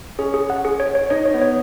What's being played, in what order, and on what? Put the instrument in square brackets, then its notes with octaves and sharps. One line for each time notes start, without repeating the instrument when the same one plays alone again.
[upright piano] C#4 [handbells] G#4
[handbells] G#4
F#5
G#4
C#5
C#5
[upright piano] D#4 [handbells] C#5
[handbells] C#5
[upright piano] B3
[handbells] C#5